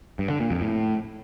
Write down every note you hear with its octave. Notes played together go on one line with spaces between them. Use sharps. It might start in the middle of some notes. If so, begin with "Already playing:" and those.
G2
D3
A#2
F2
A2